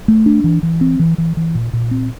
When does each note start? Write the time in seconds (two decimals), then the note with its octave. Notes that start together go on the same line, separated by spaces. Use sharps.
0.08 A3
0.26 D4
0.44 E3
0.63 E3
0.81 C4
1.00 E3
1.18 E3
1.37 E3
1.55 A#2
1.73 A#2
1.91 C4